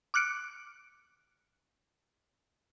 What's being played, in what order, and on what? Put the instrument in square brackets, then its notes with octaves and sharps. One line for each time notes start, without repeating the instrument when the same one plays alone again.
[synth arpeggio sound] D6 F6 F#6 C#7 D7